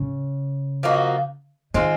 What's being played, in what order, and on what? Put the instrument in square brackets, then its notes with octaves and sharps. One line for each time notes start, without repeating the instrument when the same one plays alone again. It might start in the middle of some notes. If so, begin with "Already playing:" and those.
Already playing: [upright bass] C#3
[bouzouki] F3 A#3 D#4 F#4
[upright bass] D#3 [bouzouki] G#3 C4 F4